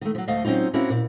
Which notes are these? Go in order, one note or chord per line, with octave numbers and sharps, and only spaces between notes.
D#3 A3
F3 F#3
D2 A3 D#5 F5
F#3 C4 C#4 D#4 F4
A#3 C4 C#4 E4 F#4 A#4
A#2